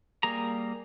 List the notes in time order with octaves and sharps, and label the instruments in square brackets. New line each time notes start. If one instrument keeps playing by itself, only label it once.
[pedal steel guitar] G3 A#3 G#4 A#5